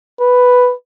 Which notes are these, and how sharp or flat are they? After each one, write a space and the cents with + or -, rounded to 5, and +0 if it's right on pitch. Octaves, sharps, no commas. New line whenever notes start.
B4 +5